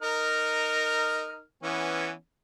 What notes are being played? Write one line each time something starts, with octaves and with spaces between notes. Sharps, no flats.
D#4 A#4 F6
E3 B3 C#4